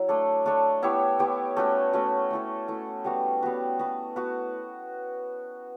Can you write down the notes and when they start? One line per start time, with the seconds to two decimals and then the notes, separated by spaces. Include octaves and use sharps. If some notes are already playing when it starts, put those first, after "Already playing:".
Already playing: F#3 E4
0.08 A3 D4 A4 C#5
0.45 A3 D4 A4 C#5
0.82 B3 E4 G4 C#5
1.19 B3 E4 G4 C#5
1.57 A3 C#4 F#4 B4
1.93 A3 C#4 F#4 B4
2.30 A3 E4 A4
2.68 A3 E4 A4
3.04 G3 B3 F#4 B4
3.42 G3 B3 F#4 B4
3.79 B3 F#4 B4
4.16 B3 F#4 B4